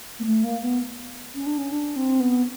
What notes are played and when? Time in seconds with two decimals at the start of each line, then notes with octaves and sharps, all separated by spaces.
0.19 A#3
0.25 A3
0.44 A#3
0.62 B3
1.35 C#4
1.46 D4
1.58 C#4
1.72 D4
1.96 C4
2.20 B3